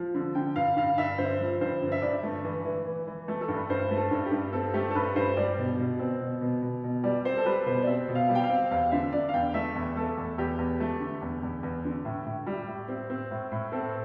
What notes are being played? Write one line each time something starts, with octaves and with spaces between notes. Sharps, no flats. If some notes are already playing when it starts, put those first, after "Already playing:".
Already playing: F3
D3
D3 G5
G2 F5
G2 F5
G2 E5
D3 C5
F3
G2 C5
D3
E5
G2 D5
A3
E3
E3
E3
E3
A3
A4
G2
B4
G2 C5
A3
A4
G2
G4
G2
C4 A4
A3 G4
A4
G2 B4
G2 C5
G3 D5
B2
B2
C4
B2
B2
B2
B2
G3 D5
C4 C5
A4
G3 B4
B2 C5
D5
C4 E5
B2
F5
G3
G5
F5
C4
E2 F5
D3 E5
D3 D5
F5
E2 G5
A3 E5
E2
A3 A4
E2
E2 G4
E2
A3
D3
E2
E2
E2
D3
A2
A2
G3
A2
C4
C4
A2
A2
C4 A4